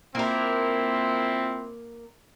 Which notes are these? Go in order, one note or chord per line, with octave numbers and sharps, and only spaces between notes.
A#3 C4 E4 F4 A#4